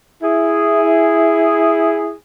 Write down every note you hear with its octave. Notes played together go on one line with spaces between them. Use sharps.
E4 G#4